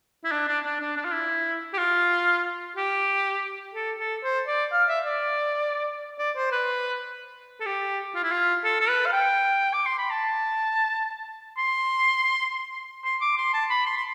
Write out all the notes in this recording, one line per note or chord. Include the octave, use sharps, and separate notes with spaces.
E4
D4
D4
D4
D4
D4
F4
E4
G4
F4
G4
A4
A4
C5
D5
F5
E5
D5
D5
C5
B4
A4
G4
F4
E4
F4
A4
A4
B4
F5
G5
D6
C6
B5
A5
C6
C6
D6
C6
A5
B5
C6
C6